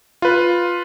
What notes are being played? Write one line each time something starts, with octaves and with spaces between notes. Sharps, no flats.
F4 B4